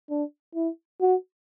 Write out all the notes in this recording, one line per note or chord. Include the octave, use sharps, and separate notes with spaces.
D4
E4
F#4